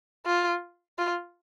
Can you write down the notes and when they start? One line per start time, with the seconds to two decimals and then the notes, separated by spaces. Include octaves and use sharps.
0.26 F4
0.98 F4